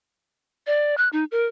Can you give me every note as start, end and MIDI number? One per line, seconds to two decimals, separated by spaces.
0.67 0.95 74
0.97 1.09 90
1.13 1.24 63
1.32 1.47 70